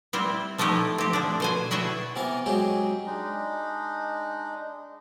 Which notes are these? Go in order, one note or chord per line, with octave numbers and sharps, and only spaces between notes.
G3 C4 E4
F3 A3 D#4 E4 G4
C4 G4
D3 F3 D4
B2 C5 G#5
E4 F#4 G#4 G5 A5
C3 E3 B3 A#4 D6
F#3 G#3 C4 G4 G#4
G#3 D4 D#4